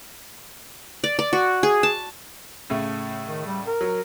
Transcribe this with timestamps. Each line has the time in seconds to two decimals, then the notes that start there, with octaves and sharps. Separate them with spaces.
1.04 D5
1.19 D5
1.33 F#4
1.63 G#4
1.83 A5
2.70 A2 C#3 A3
3.26 D#3
3.46 G3
3.67 A#4
3.81 F#3